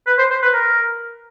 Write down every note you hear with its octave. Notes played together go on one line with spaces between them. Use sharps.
B4
C5
C5
B4
A#4